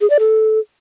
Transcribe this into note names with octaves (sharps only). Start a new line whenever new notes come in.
G#4
D5
A4